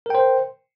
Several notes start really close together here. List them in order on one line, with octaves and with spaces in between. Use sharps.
A#4 G5 C5